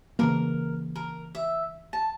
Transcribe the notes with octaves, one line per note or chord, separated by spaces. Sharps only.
C#3 E3 A#3 A#4
A#4
E5
A5